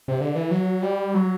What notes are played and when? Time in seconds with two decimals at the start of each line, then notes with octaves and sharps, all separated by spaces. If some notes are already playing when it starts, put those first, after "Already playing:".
0.08 C3
0.21 D3
0.35 E3
0.51 F#3
0.82 G3
1.14 F#3